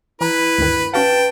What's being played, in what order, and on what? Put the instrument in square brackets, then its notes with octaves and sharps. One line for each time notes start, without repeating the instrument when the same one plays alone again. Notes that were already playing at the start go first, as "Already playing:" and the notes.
[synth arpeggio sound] E3 A#5 [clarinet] E4 [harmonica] B4
[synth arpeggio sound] D2 G2 D#3
[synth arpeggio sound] C#4 F#4 F5 [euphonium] B4 [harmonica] G5 [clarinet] A5